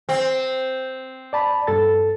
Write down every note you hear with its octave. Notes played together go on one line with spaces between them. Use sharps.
C4
D5 A5 B5
G2 A4 A6